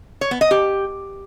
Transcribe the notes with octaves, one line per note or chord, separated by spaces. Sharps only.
C#5
B3
D#5
G4